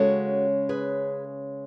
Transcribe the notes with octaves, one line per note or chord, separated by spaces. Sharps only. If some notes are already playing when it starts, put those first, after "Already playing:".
Already playing: C#3 G#3 C#4 F#4 A4
G#4 B4